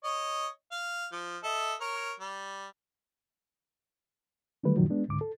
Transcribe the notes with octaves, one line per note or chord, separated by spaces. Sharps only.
C#5 D#5
F5
F3
A4 D#5 E5
A#4 C#5
G3
D3 D#3 F#3 G3 A3 B4
F#2 A#2 D#3 F3 F#3
G#3 B3 D4
C#2 G#2 D3 D6
A4